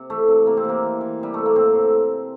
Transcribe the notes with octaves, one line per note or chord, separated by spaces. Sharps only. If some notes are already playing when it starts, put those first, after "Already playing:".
Already playing: C3
E3 A3
C3
C3 A#3
C4
E3 A#3
E3
E3
C3 G3
C3 A3
A#3
A2 C4
A2